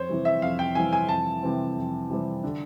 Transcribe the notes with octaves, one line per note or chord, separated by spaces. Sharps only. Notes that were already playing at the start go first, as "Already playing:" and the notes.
Already playing: F2 C5 C#5
C3 E3 G3 C4
E5
F2 F5
G5
C3 E3 G3 C4 G#5
G#5
F2 A5
C3 E3 G3 C4
F2
C3 E3 G3 C4
D3